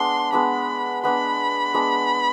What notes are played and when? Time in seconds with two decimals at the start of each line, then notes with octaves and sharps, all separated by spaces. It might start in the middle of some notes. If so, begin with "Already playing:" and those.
Already playing: G#3 B3 D4 C6
0.33 G#3 B3 D4 B5
1.03 G#3 B3 D4 B5
1.74 G#3 B3 D4